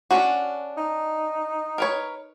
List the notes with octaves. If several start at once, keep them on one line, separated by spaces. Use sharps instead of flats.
C#4 D4 F#4
D#4
A#4 B4 C#5